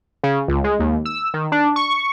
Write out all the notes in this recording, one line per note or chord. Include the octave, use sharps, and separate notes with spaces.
C#3
C#2
G#3
D#2
E6
D#3
D4
C#6